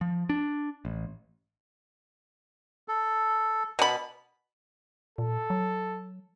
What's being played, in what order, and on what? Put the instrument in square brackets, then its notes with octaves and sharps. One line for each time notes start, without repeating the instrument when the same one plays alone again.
[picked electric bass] F3
D4
A1
[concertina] A4
[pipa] B2 B5
[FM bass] A#2 [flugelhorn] A4
[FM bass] F#3